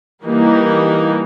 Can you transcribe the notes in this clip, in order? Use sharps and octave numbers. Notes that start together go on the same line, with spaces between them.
E3 G3 A#3 D#4